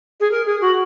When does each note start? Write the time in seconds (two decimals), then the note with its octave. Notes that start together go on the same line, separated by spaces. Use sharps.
0.20 G#4
0.31 A#4
0.46 G#4
0.61 F#4